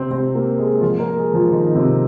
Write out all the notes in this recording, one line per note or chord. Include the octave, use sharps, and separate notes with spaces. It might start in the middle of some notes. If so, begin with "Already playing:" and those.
Already playing: C3 C4
C3 C4
A#3
G#3 G#4
F3 F4
A#3 A#4
G#3 G#4
F3 F4
D#3 D#4
C3 C4